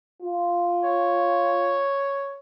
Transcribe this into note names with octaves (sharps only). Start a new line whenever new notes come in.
F4
C#5